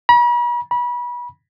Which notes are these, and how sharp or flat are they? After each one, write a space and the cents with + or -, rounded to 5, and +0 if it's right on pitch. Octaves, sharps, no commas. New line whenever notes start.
B5 -45
B5 -30